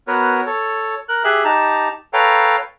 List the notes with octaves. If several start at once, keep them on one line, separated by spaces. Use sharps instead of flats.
B3 F#4 A#4 B4 C#5
A4 C#5
A#4 F#6
G4 G#4 E5 F#6
D#4 G4 A5 A#5
A4 B4 C#5 F5 G5 A#5